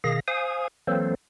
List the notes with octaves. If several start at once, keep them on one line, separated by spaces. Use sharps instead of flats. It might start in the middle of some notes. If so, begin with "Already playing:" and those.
B2 D#3 G#4 F5 A#6
C5 F5 G#5 D#6
E3 F#3 A#3 C4 A4 C5